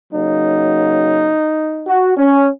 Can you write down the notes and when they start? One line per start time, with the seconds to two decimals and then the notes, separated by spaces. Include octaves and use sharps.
0.12 C#3 F#3 A#3 D#4
1.88 F#4
2.17 C#4